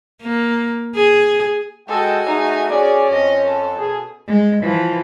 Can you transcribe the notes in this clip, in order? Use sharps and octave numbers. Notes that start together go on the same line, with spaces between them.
A#3
G#4
G#3 F#4 A4 D#5 G5 G#5
A3 D#4 G#4 E5
C#4 G#4 D5
F2 D#5
A4
B2 G#4
G#3
E3 F3